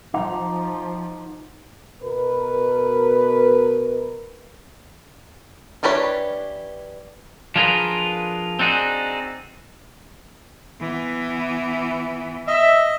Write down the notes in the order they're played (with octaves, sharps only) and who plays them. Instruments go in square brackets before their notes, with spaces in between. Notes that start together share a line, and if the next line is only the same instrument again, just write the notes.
[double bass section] F3 [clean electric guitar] D#4 [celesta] F#5 D6
[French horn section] B2 A#4 B4
[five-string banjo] E3 D4 G4 B4 C#5
[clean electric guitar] F3 D4 F4 G#4 A#4 B4
C4 D4 D#4 F#4 G#4
[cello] E3 B3
[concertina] D#5 [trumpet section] E5